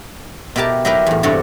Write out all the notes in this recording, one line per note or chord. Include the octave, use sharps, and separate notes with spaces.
B2 E4 G4 A#4 A5
F#3 D#4 E4 G4 A#4 B4
E2 A2
G2 C3 F#4 A4 C#5 D5